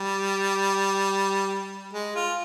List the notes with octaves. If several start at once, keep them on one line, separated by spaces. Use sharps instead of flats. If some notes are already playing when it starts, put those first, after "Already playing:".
Already playing: G3
G#3
F4